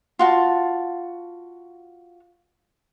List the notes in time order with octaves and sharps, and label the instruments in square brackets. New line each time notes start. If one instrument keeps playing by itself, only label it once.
[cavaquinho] F4 F#4 A5